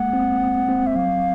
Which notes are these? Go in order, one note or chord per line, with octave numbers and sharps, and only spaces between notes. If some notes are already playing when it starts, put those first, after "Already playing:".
Already playing: G#3 A#3 F#5
C4
C4
C4
E5
F#3 F5